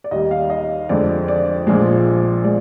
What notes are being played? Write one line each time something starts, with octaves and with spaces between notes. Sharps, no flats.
D5
D#2 D#3 G3 D#5
F5
D#5
F2 D3 G#3 D5
D5
A#1 A#2 F3 G#3
F3 G#3 D5